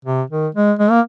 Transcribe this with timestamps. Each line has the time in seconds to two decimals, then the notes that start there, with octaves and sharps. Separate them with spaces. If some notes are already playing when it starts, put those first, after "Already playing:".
0.05 C3
0.30 D#3
0.55 G#3
0.79 G#3
0.90 A#3